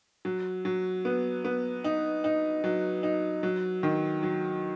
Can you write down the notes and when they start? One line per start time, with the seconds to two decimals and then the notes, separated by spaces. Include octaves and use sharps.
0.25 F#3
0.65 F#3
1.05 B3
1.45 B3
1.84 D#4
2.24 D#4
2.64 F#3
3.03 D#4
3.43 F#3
3.83 D#3
4.23 F#3